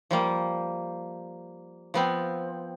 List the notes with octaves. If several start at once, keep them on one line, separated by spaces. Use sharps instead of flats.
F3 G3 A#3
F3 B3 C4